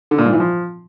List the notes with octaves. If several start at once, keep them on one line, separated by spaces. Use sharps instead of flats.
D3
A#2
G#2
E3
F3